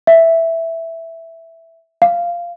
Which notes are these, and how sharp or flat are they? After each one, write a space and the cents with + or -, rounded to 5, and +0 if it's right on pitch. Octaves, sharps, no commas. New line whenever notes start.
E5 +0
F5 -10